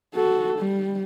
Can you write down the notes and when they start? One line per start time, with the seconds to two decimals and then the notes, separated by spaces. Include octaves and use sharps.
0.14 F#4 A4
0.59 G3